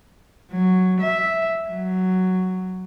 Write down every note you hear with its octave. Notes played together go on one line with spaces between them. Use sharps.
F#3
E5
F#3